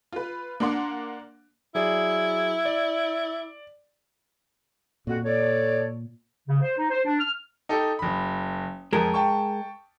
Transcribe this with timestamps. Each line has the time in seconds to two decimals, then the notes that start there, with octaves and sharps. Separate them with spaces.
0.12 F4 B4
0.60 A#3 D4 F#5 C6 D6
1.75 F#3 E4 G#4 D5
2.65 D5
5.07 F2 A#2 F#4
5.24 A4 C#5 D5
6.48 C#3
6.62 C5
6.78 D#4
6.90 C5
7.06 D4
7.19 F6
7.69 D#4 G4 A4
7.99 F#1 B5
8.93 F2 G#3 G#4 A#4
9.14 G5 A5 C#6